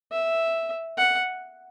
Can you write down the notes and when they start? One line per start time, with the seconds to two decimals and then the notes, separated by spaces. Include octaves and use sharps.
0.12 E5
0.98 F#5